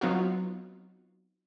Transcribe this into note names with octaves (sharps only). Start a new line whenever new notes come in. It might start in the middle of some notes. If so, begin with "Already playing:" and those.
F#3 B3 C4 D#4 F4 F#4